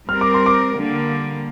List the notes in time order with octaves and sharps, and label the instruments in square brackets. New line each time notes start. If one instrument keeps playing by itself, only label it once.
[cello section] G3 C4 A#4 [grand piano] F6
[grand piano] D6
C6
D6
[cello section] D3 G3 A#3